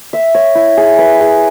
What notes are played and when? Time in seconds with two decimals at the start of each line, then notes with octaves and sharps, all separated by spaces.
0.13 E5
0.35 C#5
0.55 E4
0.77 G#4
0.99 B4
1.20 G#4